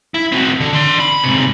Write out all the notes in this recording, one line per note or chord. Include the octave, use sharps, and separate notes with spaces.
E4
C4 F#4
D3
D4 C6
B5
G#2 C3